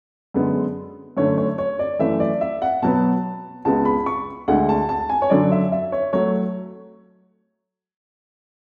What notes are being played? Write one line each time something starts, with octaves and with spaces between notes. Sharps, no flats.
F#2 D3 G#3 B3
F#2 D3 A3 C#5
C#5
C#5
D5
F#2 E3 A3 E5
D5
E5
F#5
B2 F#3 B3 A5
C#2 C#3 G#3 B3 A5
B5
C#6
D2 D3 G#3 F#5
A5
A5
G#5
C#5
F#2 D3 F#3 D5
E5
E5
C#5
F#3 A3 C#5